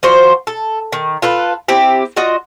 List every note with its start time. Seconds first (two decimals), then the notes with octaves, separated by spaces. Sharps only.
0.03 F3 F#4 C5
0.47 A4
0.92 D#3
1.22 F4 A4 B4
1.68 C4 E4 G4
2.17 F4 F#4 D#5